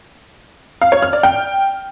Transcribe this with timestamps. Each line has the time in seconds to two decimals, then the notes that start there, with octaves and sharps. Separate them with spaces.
0.82 F5
0.92 C#5
1.02 F6
1.13 D5
1.23 G5